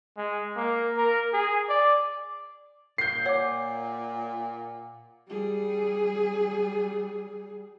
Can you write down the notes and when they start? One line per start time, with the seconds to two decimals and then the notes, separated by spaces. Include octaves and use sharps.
0.17 G#3
0.57 A#3
0.97 A#4
1.33 G#4
1.70 D5
2.98 A#2 G6 C7
3.26 C#5 F#5 D6
5.29 G3 G#4